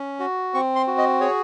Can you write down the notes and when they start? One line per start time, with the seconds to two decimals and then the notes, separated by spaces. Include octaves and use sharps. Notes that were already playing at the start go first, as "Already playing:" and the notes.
Already playing: C#4
0.20 F#4
0.54 C4 C#6
0.75 C6
0.87 F#4
0.98 D#5
1.21 G#4 C#5